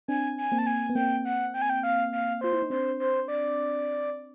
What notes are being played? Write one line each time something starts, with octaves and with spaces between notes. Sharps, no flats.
C4 D4 G#5
G#5
A#3 C4
A5
G#5
B3
A#3 C4 G5
F#5
G5
G#5
G5
F5
F5
F4 C5
E4
D#4
C4 D4 C5
C5
D5